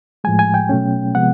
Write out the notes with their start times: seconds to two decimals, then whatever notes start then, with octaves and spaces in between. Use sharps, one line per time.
0.24 A2 F3 G#3 G#5
0.39 G#5
0.54 G5
0.69 B2 F#3 A3 C#4
1.15 C3 F3 G#3 B3 F#5